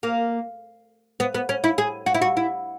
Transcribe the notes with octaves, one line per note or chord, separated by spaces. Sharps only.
A#3
B3
B3
C#4
E4
G#4
F#4
E4
F#4
E4